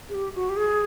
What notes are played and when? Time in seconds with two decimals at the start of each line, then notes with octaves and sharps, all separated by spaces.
0.09 G#4
0.14 G4
0.35 F#4
0.49 G4
0.57 G#4